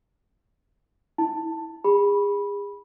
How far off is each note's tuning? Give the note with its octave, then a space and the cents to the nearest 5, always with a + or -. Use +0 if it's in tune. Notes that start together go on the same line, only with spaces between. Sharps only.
E4 -20 A5 +10
G#4 -35 B5 -15